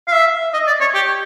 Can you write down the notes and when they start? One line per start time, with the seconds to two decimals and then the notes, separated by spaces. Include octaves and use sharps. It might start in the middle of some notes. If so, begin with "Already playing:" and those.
0.08 F5
0.13 E5
0.54 D#5
0.67 D5
0.81 C#5
0.94 G4